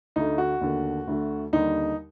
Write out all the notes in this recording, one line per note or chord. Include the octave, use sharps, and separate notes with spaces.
D2 D3 A3 D#4
F#4
D#2 D3 A3
D2 D3 A3
D#2 D3 G3 D#4